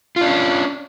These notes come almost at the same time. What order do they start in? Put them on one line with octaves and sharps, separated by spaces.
F4 D4 C#4